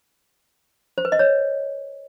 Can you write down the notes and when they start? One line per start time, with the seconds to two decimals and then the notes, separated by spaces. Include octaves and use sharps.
0.98 C5
1.05 B4
1.12 D#5
1.19 C#5